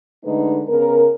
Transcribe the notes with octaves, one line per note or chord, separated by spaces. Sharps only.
D3 G#3 A3 D#4 B4
C#3 B3 A#4